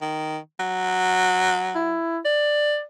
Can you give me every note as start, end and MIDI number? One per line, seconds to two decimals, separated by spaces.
0.02 0.38 51
0.60 2.02 54
1.75 2.18 64
2.25 2.82 74